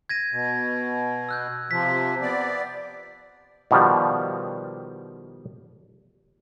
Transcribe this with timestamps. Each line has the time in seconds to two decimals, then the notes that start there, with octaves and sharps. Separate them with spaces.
0.09 G#6 A#6 D#7
0.32 B2
1.29 E6 F#6 G6
1.71 C3 F3 B6
2.22 B3 D5
3.71 B2 D#3 F3 G3